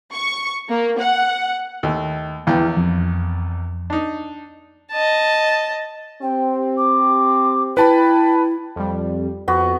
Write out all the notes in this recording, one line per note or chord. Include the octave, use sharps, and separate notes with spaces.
C#6
A#3
F#5
D#2 A3
A#1 E2 E4 F5 G5
F2
D4 D#4
D#5 A5
C4 G4 G5
D6
E4 B4 G5 A5 B5
F2 G3
F2 B3 F#4